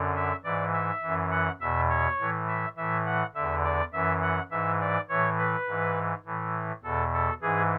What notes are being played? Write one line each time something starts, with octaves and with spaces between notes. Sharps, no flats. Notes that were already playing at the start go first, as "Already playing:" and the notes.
Already playing: F#2 D3
E5
G#2 E3 D5
E5
F#2 E3
F#5
E2 B2 E5
C#5
A2 E3
E5
A2 E3 E5
F#5
E2 D3 E5
D5
F#2 E3 E5
F#5
G#2 E3 E5
D5
A2 E3 C#5
B4
G#2 E3
A2 E3
E2 B2 A4
A4
G#2 E3 G#4